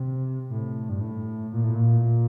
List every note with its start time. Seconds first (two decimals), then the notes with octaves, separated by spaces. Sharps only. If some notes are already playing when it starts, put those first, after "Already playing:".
Already playing: C3
0.50 A2
0.89 G2
1.01 A2
1.52 A#2
1.64 A2
1.75 A#2